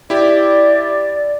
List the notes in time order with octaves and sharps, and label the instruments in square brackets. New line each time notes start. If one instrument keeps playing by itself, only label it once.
[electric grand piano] E4 G4 [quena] D5